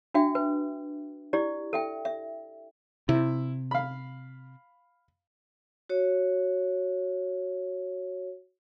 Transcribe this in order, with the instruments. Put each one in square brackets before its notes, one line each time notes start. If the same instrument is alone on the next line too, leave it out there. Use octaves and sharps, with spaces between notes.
[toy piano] D4 F#4 E5 G5
B4
E4 G4 D5
A4 E5 G5
E5
[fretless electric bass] C3 [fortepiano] E4
[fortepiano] F5 B5
[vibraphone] F#4 C#5